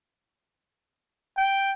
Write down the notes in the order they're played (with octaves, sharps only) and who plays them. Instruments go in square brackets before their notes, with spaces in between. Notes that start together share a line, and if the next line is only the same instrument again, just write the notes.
[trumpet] G5